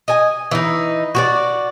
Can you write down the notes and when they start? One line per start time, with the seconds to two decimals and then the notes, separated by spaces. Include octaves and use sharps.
0.08 D#5 G#5
0.51 E3 D#4
1.15 F#4 G4 D5